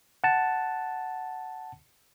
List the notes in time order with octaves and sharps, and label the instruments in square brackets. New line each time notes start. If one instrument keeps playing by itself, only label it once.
[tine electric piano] F#5 A5